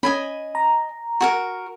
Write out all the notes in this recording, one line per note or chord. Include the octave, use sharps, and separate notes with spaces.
C#4 D#5 G#5 B5
A#5
F#4 G#4 A#4